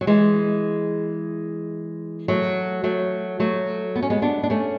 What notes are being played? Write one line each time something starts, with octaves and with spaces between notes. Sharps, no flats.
F#3
E3 G#3
F#3 A3
F#3 A3
F#3 A3
B3
C#4
G#3 B3
B3 D4
D4
A3 C#4